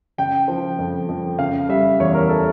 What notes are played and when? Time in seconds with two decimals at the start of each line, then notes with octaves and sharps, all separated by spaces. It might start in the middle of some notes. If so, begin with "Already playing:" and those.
0.18 C#3 G5
0.48 F3
0.78 F2
1.09 F2
1.39 C#3 F5
1.69 G3 E5
1.99 E2 C#5
2.14 A#4
2.29 A4